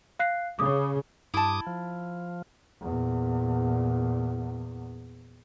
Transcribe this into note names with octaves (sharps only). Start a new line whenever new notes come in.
F5 F#6 C7
C#3 D6 D#6
G2 E4 A5 D6 D#6
F3
E2 A#2